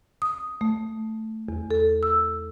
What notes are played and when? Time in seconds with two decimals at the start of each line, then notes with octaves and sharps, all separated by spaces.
0.22 D#6
0.61 A3
1.49 E2
1.71 A4
2.03 E6